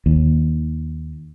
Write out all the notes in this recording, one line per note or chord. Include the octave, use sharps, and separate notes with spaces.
D#2